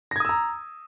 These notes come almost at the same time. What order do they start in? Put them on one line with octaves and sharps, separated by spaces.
A#6 G#6 D#6 E6 A#5